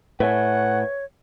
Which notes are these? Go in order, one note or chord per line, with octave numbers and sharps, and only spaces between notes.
A2 B4 C#5 E5 F#5 G#5